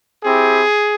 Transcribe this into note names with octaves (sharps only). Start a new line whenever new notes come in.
C4 E4 G4 G#4